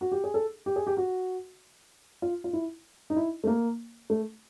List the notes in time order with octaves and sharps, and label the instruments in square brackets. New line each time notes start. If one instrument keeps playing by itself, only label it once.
[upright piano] F#4
G4
G#4
A4
G4
G#4
G4
F#4
F4
F4
E4
D#4
E4
A3
A#3
A3